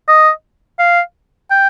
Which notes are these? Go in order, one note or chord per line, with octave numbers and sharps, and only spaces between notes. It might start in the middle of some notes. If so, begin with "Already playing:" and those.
D#5
F5
G5